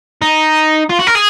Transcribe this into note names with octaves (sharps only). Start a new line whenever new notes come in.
D#4
F4
F#4
A#4
G#4